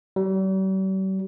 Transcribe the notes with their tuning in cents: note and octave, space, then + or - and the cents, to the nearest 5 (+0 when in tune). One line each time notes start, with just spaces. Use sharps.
G3 -45